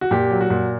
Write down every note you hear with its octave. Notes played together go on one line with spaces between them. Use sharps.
F#4
A#2 G4
F#3
F#4
A#2